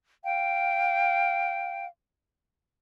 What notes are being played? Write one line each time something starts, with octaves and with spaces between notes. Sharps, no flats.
F5 G5